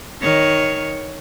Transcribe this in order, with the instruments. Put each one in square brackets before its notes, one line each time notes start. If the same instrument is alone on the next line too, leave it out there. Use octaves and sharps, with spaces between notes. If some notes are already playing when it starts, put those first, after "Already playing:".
[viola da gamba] D#3 C#5